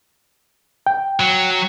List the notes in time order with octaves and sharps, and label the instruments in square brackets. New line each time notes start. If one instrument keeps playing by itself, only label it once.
[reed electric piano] G5
[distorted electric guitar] F#3